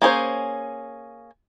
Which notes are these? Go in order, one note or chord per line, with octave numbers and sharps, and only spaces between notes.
A#3 C#4 G#4 C5